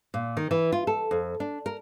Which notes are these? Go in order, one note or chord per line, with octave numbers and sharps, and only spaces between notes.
A#2
D#3
E3
F4
A4
F2
D4
A#4